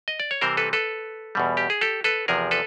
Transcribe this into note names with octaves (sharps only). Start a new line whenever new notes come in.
D#5
D5
C#5
C3 E3 G3 C4 A#4 C5
A4 B4
A4 B4
E2 B2 G3
G4
G#4
G4 A4
A4 B4
E2 C3 F3 G#4 A#4
A4 B4